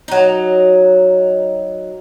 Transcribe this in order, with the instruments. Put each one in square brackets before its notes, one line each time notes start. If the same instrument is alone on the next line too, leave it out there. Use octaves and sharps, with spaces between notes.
[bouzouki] F#3 D#4